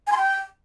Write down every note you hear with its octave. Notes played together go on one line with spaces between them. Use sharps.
G#5
C6
G5